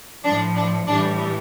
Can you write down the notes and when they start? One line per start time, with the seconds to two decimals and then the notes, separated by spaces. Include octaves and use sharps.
0.24 A2 F3 D4
0.55 D4
0.87 A2 E3 G3 D4